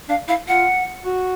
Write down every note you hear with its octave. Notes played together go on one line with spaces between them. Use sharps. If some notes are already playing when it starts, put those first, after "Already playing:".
D4 F5
E4 F5
F4 F#5
F#4